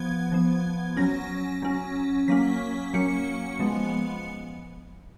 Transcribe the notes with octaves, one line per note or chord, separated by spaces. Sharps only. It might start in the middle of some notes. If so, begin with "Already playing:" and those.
Already playing: F3 B3 G#6
F3 B3
F#3 C#4 A#6
F#3 C#4
F#3 A#3 C#4 B6
F#3 A#3 C#4 C#7
F3 G#3 B3